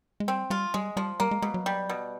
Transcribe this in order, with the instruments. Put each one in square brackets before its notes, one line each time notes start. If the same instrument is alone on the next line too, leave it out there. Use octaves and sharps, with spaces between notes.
[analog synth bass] G#3
[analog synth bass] G3 [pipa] C4
[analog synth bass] G3 [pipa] F4
[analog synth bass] G3 [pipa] G#3
[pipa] F3 [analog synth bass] G3
[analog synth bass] G3 [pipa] A#3
[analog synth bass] G#3
[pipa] B2 [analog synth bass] G#3
[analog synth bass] F#3
[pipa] G3
B2